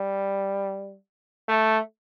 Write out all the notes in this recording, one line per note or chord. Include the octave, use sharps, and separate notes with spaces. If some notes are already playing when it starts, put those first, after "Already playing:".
Already playing: G3
A3